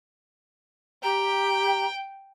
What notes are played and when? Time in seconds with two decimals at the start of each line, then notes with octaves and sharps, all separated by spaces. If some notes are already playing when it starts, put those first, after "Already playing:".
1.03 G4 G5 A#5